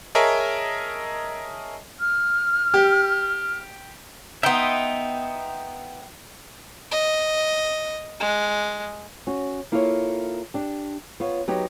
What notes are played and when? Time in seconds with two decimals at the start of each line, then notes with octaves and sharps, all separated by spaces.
0.15 G#4 A#4 C#5 D#5 E5 A5
1.99 F6
2.74 G4
4.43 B3 D#4 E5 G5 C6
6.91 D#5
8.20 G#3
9.27 C#4 F#4
9.72 A#3 E4 F4 A4 B4 C#5
10.54 D4 G4
11.20 B3 F4 C#5
11.48 F#3 B3 D#4 G4